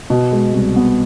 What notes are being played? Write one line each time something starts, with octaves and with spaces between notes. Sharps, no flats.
B2
G#3
C2
B3